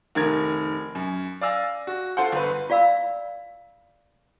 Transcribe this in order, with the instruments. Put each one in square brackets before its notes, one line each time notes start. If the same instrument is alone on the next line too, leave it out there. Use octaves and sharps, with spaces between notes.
[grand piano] F1 D#3 A#4 G#6
F#2
D5 F5 G#5 E6 A#6
F#4
F4 A4 C5 F#5
G1 B4
[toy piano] F4 D5 F5 B5 E6